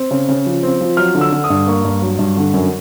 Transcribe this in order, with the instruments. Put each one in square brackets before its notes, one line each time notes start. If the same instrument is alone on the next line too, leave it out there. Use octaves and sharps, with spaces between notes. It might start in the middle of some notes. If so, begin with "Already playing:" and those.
Already playing: [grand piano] C4
C#3
C#3
F3
C4
F3
F#3 F6
D3
E6
D3
D#6
G2
A#3 C#6
G2
F#3
G2
D3
F#2